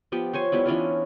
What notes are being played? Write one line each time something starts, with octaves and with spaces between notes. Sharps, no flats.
F3 B3 G4
C5 C#5 G#5
G3 B3 E4
E3 C#4 D4 F4